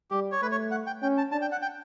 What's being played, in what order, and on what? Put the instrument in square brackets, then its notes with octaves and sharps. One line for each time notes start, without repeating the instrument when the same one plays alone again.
[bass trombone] G3 [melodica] G4
[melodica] C#5
[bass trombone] A3 [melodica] B4
[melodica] C#5
F#5
G5
[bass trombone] C#4 [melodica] G5
[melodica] A5
[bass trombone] D4 [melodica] A5
[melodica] G5
F#5
G5